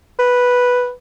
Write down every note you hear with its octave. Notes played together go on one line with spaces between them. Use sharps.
B4